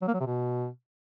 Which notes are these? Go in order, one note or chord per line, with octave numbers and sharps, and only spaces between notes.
F#3
A#3
F#3
C3
B2